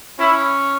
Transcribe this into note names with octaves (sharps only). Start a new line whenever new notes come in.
C#4 E4